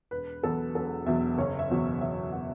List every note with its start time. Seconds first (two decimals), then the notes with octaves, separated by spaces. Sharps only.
0.11 E1 B4
0.43 E2 B2 F#3 A4
0.75 E1 A4
1.06 E2 B2 F#3 E5
1.38 F#1 C#5
1.59 E5
1.70 E2 B2 F#3
2.01 F#1 E5
2.32 B2 F#3 F#5